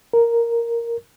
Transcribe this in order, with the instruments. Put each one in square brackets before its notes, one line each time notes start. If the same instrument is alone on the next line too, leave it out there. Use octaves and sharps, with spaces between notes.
[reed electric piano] A#4